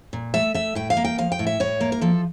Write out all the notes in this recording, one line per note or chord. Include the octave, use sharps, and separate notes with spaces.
A#2
A3 E5
A3 E5
A2 G5
F5
A#3
G5
F3 F5
G5
A2
E5
A2 C#5
A#3
A#4
F3 A4